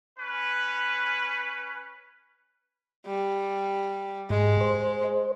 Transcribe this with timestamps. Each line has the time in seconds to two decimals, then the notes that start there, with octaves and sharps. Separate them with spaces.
0.18 C#4 B4
3.06 G3
4.30 G#2 G#3
4.61 C5